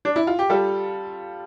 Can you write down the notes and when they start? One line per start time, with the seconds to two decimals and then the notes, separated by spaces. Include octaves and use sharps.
0.05 D4
0.16 E4
0.27 F4
0.39 G4
0.49 G3 F4 A4